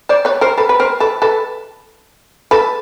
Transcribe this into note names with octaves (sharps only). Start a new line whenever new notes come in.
C5 D5
B4 C#5
A#4 C5
A4 B4
B4
A#4 C5
A4 B4
A4 B4
A4 B4